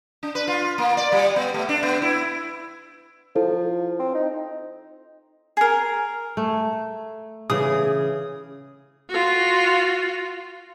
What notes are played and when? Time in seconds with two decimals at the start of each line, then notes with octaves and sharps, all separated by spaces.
0.23 D4
0.35 B4
0.48 F4
0.78 A#3
0.97 D5
1.12 G3
1.36 B3
1.54 A3
1.69 D4
1.83 B3
2.02 E4
3.36 F3 E4 A4
3.99 C4
4.15 D#4
5.57 G#4 A#4
6.37 A3
7.50 C#3 E3 G#4 D#6
9.10 F4 F#4